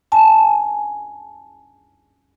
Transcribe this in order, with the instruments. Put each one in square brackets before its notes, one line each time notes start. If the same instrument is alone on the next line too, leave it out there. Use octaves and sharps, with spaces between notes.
[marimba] G#5 A5